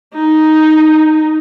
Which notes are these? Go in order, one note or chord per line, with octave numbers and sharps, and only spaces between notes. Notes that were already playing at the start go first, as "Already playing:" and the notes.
D#4